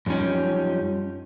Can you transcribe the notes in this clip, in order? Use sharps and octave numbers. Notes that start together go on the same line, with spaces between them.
F#2 F3 G3 C#4 D#4